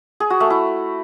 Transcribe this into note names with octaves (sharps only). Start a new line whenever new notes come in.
G#4
F#4
A3
E4